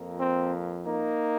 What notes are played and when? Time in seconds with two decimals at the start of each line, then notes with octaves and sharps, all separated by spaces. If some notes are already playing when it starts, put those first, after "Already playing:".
Already playing: F2 F3 A#3
0.18 C4
0.84 A#3 D#4